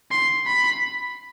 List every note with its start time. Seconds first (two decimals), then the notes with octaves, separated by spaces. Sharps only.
0.11 C6
0.46 B5